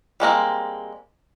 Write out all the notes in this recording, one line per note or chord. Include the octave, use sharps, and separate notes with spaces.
G3 G#3 A#3 C4